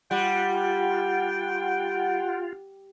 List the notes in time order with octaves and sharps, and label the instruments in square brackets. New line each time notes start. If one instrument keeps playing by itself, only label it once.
[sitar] G3 [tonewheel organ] F4 [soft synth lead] F#5 [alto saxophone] G5